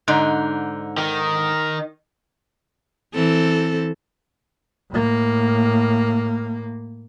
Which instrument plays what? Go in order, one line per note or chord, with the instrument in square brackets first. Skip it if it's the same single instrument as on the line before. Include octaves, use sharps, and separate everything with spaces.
[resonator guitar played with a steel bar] G#2 D3 D#4
[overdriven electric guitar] D#3
[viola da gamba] E3 C4 A4
[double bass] A2 A#3